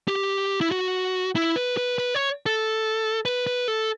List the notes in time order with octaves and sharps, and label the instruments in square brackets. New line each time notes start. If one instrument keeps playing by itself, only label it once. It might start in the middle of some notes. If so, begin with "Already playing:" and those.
[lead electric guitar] G4
E4
F#4
E4
B4
B4
B4
C#5
A4
B4
B4
A4